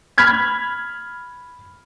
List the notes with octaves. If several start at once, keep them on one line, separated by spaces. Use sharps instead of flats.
B5 F6 G#6 B6